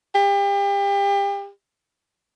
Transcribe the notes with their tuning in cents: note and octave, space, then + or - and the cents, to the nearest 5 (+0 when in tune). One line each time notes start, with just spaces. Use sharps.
G4 +35